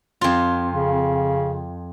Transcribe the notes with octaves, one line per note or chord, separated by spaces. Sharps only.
F2 F4
C#3